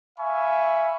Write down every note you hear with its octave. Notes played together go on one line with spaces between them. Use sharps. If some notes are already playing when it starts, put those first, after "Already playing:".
E5 F5 G#5 B5 C#6